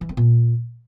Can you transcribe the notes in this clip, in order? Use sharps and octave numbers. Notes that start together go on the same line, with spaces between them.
E3
C4
A#2